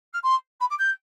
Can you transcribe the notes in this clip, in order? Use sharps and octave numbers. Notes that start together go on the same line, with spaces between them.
F6
C6
B5
D6
G6